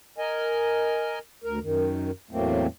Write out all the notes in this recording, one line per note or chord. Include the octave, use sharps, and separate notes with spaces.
A#4 D#5 G#5
D2 A#4
F#2 D#3
E2 A2 F#3 A3 A#3 C4